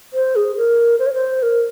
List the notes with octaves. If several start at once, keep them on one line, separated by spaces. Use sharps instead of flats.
C5
G#4
A#4
C5
C#5
C5
A#4